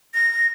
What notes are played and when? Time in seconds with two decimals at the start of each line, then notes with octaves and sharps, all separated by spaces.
0.14 A#6